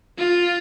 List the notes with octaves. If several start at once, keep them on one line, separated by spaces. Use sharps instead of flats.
F4